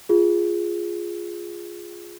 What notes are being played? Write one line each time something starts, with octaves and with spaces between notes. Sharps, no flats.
F4 G#4